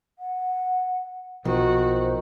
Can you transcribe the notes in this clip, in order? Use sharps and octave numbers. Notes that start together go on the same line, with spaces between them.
F#5
B1 B2 D#3 F3 F#4 C5